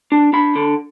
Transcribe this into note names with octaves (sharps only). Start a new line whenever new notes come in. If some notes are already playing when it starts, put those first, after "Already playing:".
D4
D4 B5
D3